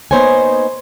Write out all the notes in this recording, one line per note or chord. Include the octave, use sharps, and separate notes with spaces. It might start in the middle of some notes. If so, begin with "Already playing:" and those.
A#3 B3 D#4 C5 C#5 G#5